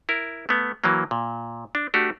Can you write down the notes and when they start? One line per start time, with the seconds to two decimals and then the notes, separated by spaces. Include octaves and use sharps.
0.09 E4 A#4
0.49 A3 B3
0.84 E3 F#3 A#3
1.11 A#2
1.75 D4
1.94 A3 D4 F#4 G4